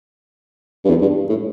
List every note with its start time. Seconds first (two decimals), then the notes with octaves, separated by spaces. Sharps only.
0.85 G2
0.89 E2
1.01 G2
1.29 A2